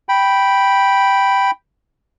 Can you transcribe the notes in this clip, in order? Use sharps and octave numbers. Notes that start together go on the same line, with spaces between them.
G5 B5